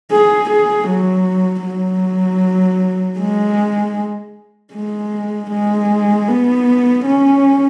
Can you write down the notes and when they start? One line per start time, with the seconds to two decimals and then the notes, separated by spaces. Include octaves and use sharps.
0.12 G#4
0.50 G#4
0.89 F#3
1.66 F#3
3.20 G#3
4.75 G#3
5.51 G#3
6.28 B3
7.06 C#4